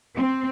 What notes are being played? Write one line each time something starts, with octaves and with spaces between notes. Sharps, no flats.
C4